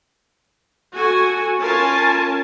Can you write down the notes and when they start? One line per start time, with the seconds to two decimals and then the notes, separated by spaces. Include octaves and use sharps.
0.93 F#4 A4 G#5
1.60 C#4 F4 A#4 G#5 A5